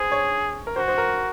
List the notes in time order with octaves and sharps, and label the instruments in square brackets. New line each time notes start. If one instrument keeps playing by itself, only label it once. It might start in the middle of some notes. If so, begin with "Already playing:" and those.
Already playing: [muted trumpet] G#4 [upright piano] C5
[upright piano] C#5
A#4
[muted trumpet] F#4 [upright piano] C5
[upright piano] C5
A#4